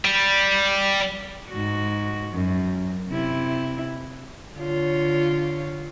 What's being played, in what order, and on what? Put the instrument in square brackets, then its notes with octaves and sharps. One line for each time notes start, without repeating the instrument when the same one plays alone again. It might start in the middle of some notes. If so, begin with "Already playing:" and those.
[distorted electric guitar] G3
[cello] G#2 F#4
F#2
C3 E4
[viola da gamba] D3 F4 C#5